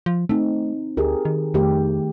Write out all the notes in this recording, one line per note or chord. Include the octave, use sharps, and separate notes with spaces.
F3
A3 C4 D#4
D2 G4 G#4 A#4
D#3
F2 D#3 A3 G4